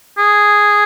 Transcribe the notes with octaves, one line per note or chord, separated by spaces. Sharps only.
G#4